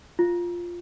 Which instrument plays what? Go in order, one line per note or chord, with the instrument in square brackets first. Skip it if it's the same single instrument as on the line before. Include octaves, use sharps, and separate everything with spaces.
[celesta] F4